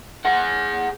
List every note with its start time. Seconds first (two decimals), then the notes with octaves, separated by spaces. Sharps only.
0.25 G#4 F#5